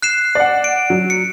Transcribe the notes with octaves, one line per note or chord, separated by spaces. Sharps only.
F#6 C7 E7
D5 F#5
D7
F#3
C#7